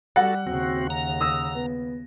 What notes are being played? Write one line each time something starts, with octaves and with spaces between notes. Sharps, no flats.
G3 F#4 A4 F#5
D#2 C#3 C4 F#4
A#5
D#6 E6 A#6
B3